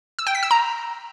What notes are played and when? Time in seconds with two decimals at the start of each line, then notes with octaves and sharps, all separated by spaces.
0.19 E6
0.27 G5
0.35 B6
0.43 E6
0.51 A#5